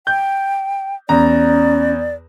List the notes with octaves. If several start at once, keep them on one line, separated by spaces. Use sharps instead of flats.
G5 G6
E2 C#4 D5 A#5